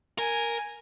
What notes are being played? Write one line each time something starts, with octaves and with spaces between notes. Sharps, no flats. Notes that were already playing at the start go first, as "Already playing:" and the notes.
A#4 G#5